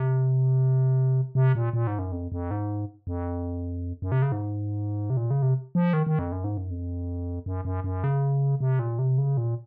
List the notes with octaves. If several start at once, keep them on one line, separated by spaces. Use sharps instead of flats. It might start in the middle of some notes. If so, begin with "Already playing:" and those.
Already playing: C3
C3
A#2
A#2
G#2
F#2
F2
F2
G#2
F2
F#2
C3
C#3
G#2
C3
A#2
C#3
C3
F3
D#3
D#3
F2
F#2
G#2
F#2
F2
F#2
F#2
F#2
C#3
C3
A#2
C3
C#3
A#2